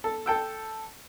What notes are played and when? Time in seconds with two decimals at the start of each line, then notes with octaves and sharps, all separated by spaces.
0.04 A4
0.26 A4 G5 E6